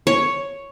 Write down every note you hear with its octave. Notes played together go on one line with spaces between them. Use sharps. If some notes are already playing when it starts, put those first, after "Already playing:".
C#5